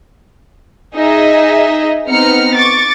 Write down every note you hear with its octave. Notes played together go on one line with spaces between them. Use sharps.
D#4 G#4 D#5 E5
B3 C4 D#4 A#5 F6 C#7
C#6 D6 A6